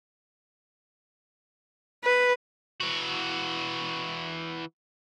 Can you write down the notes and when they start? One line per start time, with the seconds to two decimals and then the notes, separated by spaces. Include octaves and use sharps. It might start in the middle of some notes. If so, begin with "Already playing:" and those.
2.04 B4
2.80 E3 F#4